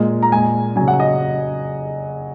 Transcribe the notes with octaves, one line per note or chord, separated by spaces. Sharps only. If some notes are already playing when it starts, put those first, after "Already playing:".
Already playing: A#2 G#3
A#5
A#2 G#3 G#5
C#3 F#3 G#5
F#5
D#5